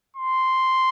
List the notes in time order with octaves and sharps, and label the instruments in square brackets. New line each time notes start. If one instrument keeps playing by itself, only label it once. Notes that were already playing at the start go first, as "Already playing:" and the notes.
[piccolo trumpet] C6